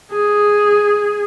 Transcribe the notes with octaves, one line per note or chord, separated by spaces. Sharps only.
G#4